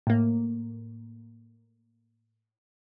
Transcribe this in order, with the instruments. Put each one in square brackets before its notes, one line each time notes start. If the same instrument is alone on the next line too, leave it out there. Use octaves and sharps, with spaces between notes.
[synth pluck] A2 A#3